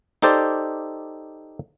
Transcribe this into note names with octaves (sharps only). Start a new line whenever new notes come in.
D#4 G4 A4 C5 D5